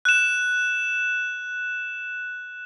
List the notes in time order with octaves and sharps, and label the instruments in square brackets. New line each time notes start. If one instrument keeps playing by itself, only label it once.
[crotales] F#6 E7